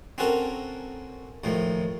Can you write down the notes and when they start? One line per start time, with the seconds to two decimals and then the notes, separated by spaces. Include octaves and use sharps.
0.18 C4 C#4 F#4 A4 A#4
1.44 D#2 A2 F3